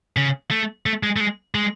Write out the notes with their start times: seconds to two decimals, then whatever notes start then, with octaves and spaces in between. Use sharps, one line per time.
0.17 C#3
0.51 A3
0.86 A3
1.03 G#3
1.16 A3
1.20 G#3
1.55 G#3